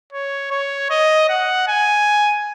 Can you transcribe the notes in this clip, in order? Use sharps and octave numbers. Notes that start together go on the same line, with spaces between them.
C#5
C#5
D#5
F#5
G#5